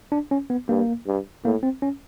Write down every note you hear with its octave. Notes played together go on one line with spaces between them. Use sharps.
D4
C#4
B3
G2 A#3
G2
A2 A#3
C4
C#4